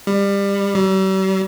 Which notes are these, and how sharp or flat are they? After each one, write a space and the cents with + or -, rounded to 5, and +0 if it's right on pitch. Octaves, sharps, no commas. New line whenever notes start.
G3 +25
G3 -45